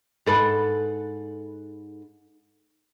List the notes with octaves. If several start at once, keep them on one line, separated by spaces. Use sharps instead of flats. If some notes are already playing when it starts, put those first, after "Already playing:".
G#2 A4 B4